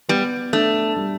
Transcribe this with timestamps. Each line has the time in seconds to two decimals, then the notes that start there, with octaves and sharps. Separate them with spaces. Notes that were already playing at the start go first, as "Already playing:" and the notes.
0.09 G3 B3
0.53 A3 D4
0.96 G3